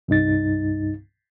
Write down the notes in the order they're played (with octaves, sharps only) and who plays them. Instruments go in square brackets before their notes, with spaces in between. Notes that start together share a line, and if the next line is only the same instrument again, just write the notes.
[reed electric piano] C2 G2 D#4 A6